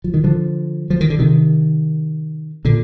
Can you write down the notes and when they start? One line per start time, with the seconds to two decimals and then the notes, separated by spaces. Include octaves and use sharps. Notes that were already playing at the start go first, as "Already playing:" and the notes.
0.04 F3
0.14 D#3
0.24 D3 F3
0.90 F3
1.01 D#3
1.10 D3
1.19 C3 D#3
2.65 A#2 D3